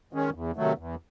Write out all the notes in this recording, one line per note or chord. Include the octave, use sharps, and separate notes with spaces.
D#3 G#3 C#4
E2
C3 D#3 F#3 A3
E2